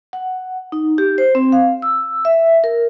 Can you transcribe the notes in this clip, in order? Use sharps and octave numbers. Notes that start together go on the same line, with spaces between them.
F#5
D#4
G4
C5
C4
F5
E6
E5
A#4